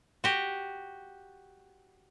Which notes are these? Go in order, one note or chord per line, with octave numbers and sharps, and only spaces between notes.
F#4 G4